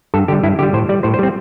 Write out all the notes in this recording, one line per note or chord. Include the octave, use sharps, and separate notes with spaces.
G2 A4
D3 G3 G4
G2 E4
D3 G3 G4
A2 C5
G3 D5
A2 C5
C5
G3 C4